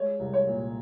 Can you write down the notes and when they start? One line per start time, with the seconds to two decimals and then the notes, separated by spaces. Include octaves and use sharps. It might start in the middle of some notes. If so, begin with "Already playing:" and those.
Already playing: G#3 C#5
0.19 C2
0.34 C#5
0.47 A#2